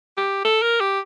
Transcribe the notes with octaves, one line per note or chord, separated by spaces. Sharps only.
G4
A4
A#4
G4